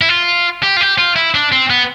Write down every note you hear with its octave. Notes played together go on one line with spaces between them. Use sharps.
E4
F4
G4
F4
G4
F4
E4
D4
C4
B3